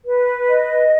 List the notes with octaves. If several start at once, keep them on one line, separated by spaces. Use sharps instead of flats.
B4
D#5